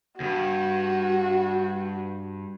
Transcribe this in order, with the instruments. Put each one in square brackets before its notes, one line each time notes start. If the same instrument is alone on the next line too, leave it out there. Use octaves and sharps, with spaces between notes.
[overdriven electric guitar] D2 G2 [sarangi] F#4